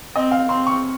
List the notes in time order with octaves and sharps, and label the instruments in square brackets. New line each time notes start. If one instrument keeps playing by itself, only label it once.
[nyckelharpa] C4 [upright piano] D#5
[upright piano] F5
[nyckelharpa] C4 [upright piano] C6
[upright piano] C#6